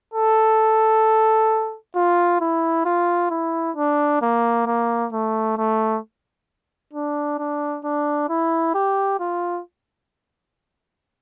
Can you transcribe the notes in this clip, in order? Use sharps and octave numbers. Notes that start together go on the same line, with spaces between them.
A4
F4
E4
F4
E4
D4
A#3
A#3
A3
A3
D4
D4
D4
E4
G4
F4